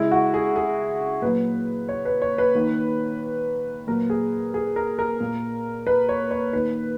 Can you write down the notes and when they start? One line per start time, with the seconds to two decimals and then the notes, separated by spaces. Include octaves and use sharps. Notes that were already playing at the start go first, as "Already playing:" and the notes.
Already playing: C#3 G#3 E4
0.11 F#4
0.34 G#4
0.56 G#4
1.22 A#2 F#3 A#3 B4
1.89 C#5
2.05 B4
2.22 C#5
2.38 B4
2.55 D#3 A#3
3.87 A#2 F#3 A#3 A#4
4.10 G#4
4.54 G#4
4.76 A#4
4.99 A#4
5.20 A#2 A#3
5.87 B4
6.09 C#5
6.31 C#5
6.53 D#3 A#3 B4